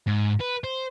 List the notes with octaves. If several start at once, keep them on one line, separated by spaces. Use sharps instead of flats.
G#2
B4
C5